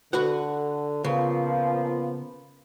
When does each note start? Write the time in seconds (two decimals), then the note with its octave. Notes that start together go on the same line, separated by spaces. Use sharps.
0.13 D3 F#4 B4 F#5
1.04 A#2 C#3 F3 B3